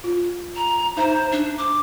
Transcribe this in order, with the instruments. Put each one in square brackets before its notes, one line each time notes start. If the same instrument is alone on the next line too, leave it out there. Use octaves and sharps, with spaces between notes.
[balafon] F4
[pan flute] A#5
[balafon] D#4 E5 A#5 [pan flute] C5
[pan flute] D4
D6